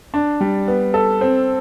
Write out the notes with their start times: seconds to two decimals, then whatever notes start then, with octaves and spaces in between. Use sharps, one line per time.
0.14 D4
0.41 G3
0.68 B3
0.94 A4
1.21 C4